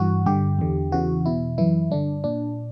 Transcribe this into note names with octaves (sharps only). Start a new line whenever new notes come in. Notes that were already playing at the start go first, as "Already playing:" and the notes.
Already playing: G2 E3 F#4
G2 D3 G4
E2 D3
E2 C#3 E3 F#4
E2 B2 E4
F#2 E3 E4
G2 D3 D4
A#2 D4